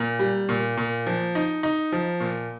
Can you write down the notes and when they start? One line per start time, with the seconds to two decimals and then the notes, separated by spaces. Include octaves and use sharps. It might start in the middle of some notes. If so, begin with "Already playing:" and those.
Already playing: A#2
0.19 G3
0.49 A#2
0.77 A#2
1.07 F3
1.35 D#4
1.63 D#4
1.92 F3
2.20 A#2